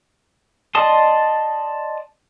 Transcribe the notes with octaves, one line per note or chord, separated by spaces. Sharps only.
D5 D#5 A5 C6 D#6